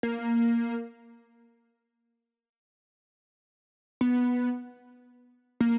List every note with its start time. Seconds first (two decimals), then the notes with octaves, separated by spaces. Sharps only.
0.03 A#3
4.01 B3
5.61 A#3